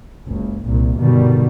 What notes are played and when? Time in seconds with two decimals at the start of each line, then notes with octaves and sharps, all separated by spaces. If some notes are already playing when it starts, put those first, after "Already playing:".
0.25 F#1 C#2
0.63 C2 A#2
0.97 G2 B2 D3 D#3 G3